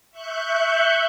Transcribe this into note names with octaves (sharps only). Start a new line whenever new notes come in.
E5 C#6 F#6 G6